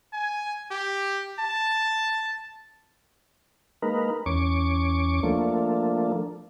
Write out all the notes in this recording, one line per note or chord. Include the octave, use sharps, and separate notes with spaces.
G#5
G4
A5
G#3 A#3 D#4 A#4 B4
E2 C#4 C#6 D6
F3 A3 A#3 D4